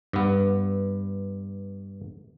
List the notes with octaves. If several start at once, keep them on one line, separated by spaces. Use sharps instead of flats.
G2 B3